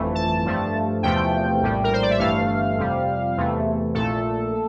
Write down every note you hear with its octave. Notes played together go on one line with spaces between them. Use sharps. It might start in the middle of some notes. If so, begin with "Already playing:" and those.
Already playing: G1 F2 E3 A3
A5
G2 F3 A3
E2 C3 F3 A3 G5
A#1 A2 G3
A#4
C5
D5
E5
G1 G2 E3 A3 F5
F2 C3 G3
E2 C3 E3 A3
A#1 A#2 A3 A4